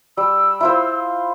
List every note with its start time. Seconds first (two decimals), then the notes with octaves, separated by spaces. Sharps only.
0.17 G3 E6
0.61 E4 F4 C5